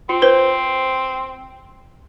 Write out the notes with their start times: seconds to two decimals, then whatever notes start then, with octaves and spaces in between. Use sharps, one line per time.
0.09 C4 F4
0.22 B4 C5